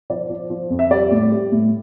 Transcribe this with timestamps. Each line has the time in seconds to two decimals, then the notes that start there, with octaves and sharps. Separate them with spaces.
0.10 F3 D5
0.30 F3
0.50 F3
0.70 F2
0.79 E5
0.91 G3 D5
1.11 A2
1.32 G3
1.52 A2